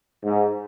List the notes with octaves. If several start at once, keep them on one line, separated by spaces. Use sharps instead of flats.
G#2